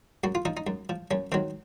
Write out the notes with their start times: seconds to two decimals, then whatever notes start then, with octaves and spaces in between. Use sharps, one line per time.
0.24 F#2 F#4
0.35 F4
0.45 F3 D#4
0.57 D#4
0.67 F#2
0.89 F3
1.11 F#2 C#4
1.32 D#3 F#3 C4